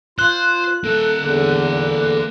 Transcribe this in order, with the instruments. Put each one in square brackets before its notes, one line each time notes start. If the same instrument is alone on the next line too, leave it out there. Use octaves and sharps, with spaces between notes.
[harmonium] F4 [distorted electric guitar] C5 [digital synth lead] F#6
[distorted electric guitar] A#3 E5 [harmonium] A4
[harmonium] E2 D3